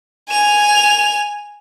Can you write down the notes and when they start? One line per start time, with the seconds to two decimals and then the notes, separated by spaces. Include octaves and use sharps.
0.29 G#5 F7